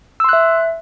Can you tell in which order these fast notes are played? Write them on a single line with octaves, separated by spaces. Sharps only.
E6 C6 F#6 E5